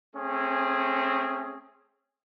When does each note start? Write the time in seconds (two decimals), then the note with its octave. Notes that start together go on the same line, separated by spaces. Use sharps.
0.14 A3 C4 C#4 G#4